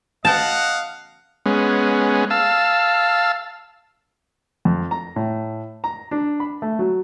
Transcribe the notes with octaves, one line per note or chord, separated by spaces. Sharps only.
D#5 F5 F#5 A5
G#3 B3 C#4
F5 A5 E6
F2
A#5
A2
A#5
D4
B5
A3
F#3